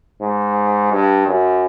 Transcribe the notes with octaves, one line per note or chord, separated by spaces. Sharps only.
G#2
G2
F#2